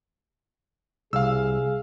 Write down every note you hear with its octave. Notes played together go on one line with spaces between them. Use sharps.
C2 G#4 F5 E6